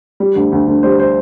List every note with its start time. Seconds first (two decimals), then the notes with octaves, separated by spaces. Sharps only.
0.20 G3
0.36 D2
0.52 D2
0.67 D2
0.83 G3 C5
1.00 C5